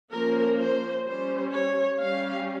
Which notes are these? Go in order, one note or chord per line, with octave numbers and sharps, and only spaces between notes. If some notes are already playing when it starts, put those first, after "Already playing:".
F3 A#3 C#4 A#4
C5
G3 C#4 C5
C#5
G3 C#4 F5